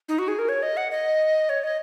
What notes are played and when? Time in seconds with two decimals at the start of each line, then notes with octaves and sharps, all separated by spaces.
0.09 D#4
0.19 F#4
0.28 G#4
0.39 A#4
0.49 C#5
0.62 D#5
0.77 F#5
0.91 D#5
1.49 C#5
1.64 D#5